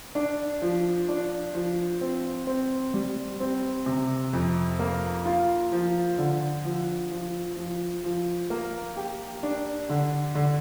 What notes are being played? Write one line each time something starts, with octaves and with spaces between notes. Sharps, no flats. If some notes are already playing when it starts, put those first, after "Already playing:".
D4
F3
D4
F3
C4
C4
G3
C4
C3
F2
A#3
F4
F3
D3
F3
F3
F3
F3
A#3
G4
D4
D3
D3